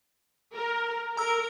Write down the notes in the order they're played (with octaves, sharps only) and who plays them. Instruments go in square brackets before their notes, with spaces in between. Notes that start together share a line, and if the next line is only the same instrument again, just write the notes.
[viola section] A#4
[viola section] A#4 [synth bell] A#5 E6